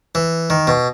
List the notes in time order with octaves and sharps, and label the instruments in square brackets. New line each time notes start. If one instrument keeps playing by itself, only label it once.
[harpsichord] E3
D#3
B2